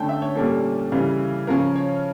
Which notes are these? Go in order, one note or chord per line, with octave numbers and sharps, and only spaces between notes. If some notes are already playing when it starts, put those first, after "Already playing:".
Already playing: D3 A3 C#4 G5 A5
E5
C#5
A#2 G3 A#3 C#4 A4
C#3 E3 G3
C#3 F3 C#4 A#4
C#5